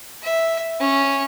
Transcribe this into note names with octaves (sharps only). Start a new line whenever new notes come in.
E5
C#4